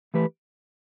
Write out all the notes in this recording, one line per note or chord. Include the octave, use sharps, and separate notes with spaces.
E3 A3 G4 B4